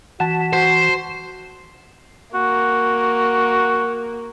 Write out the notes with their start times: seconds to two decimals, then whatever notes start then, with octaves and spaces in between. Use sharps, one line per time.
0.20 E3 F#4 F#5 A5
0.53 F#4 C5
2.34 A#3 F#4